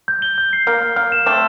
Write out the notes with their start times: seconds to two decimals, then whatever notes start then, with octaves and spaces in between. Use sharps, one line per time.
0.08 G6
0.22 G7
0.38 G6
0.53 C7
0.67 A#3 F6
0.82 F6
0.96 A#3 F6
1.12 E7
1.26 A3 C4 D6